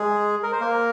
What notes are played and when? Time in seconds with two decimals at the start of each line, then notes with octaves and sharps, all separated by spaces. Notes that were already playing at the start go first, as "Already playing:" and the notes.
Already playing: G#3 G#4
0.43 A#4
0.52 C5
0.60 A#3 A#4